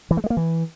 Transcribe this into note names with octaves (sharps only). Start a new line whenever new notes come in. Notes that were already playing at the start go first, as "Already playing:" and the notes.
E3
A3
G#3
A#3
E3